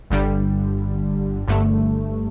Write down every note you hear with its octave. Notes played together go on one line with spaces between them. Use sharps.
G1 G2 D3 G3
G1 G2 D3 A3